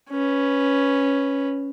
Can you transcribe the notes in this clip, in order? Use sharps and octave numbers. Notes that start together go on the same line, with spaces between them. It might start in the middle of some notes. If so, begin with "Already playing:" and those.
C#4 B4